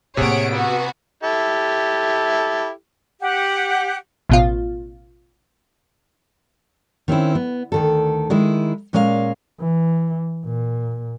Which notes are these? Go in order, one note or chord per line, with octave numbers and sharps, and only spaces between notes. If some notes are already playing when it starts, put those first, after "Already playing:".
A2 C3 A#3 G#4 C#5 F#5 D7
B3 F#4
E4 G4 A4
G4 F#5
A1 B2 F4
D#3 C4 C#4 E4
B3
D2 D#3 A4
D#3 G#3 E4
A#2 G#3 C#4 A#4 C5 F5
E3
A#2